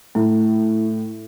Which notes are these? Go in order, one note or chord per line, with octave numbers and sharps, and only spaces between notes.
A2 E4